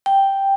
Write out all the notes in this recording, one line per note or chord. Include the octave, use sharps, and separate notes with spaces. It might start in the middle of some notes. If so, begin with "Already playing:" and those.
G5